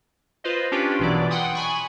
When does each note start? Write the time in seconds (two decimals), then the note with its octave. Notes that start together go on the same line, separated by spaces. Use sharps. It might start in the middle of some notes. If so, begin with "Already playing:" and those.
0.44 F4 B4 C5 D#5
0.72 C#4 D4 F4 G4 B4
0.99 A#1 B2 E3 F#3 D5
1.30 F#5 G5 C6 D#6
1.55 G#5 B5 C#6